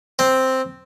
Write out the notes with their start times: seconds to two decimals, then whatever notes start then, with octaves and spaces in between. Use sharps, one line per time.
0.19 C4